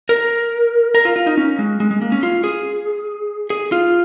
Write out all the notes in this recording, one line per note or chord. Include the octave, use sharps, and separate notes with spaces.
A#4
A#4
F4
F4
D#4
C#4
G#3
G#3
G#3
A#3
C#4
F4
G#4
G#4
F4